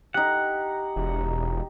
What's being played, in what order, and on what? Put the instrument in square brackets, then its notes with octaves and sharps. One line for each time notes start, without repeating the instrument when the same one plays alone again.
[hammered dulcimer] D#4 G4 [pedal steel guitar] F#5
[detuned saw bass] E1